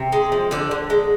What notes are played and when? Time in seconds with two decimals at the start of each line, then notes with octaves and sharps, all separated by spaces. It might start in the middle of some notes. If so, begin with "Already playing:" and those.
Already playing: C3
0.12 G#3
0.32 F3
0.51 D3 D5
0.71 D3
0.90 G#3